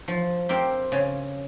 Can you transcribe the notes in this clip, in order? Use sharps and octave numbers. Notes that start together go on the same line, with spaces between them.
F3
C4 G4 A#4
C#3